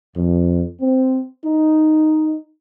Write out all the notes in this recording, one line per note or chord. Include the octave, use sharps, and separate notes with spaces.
F2
C4
D#4